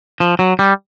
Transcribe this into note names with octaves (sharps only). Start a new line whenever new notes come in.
F3
F#3
G3